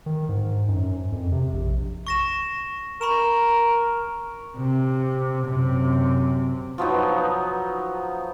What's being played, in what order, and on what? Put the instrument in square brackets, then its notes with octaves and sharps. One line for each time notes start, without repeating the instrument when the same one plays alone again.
[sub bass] D#3
G#2
F#2
F2
C3
A#1
[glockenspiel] C#6 A#6 E7
[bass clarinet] A#4 [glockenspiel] B5 C#6 E7
[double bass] C3
F#2 C3
[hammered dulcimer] F3 F#3 B3 D#4